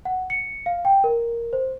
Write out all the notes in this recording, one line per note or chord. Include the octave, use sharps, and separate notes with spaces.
F#5
C#7
F5
G5
A#4
C5